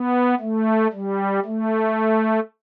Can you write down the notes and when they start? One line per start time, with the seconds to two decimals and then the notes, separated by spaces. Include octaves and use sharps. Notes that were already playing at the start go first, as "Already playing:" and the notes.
Already playing: B3
0.40 A3
0.92 G3
1.45 A3